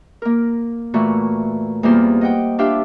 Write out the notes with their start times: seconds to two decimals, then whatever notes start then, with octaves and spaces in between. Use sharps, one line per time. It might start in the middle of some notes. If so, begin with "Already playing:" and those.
0.22 A#3 A#4
0.94 A#2 E3 A3 F#4
1.83 E2 G3 A#3 F4 C5
2.21 D#5 F#5 G5
2.59 D4 F4 G4 E5 F5 G5